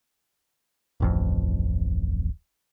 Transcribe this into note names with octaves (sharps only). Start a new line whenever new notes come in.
D1 A1 F2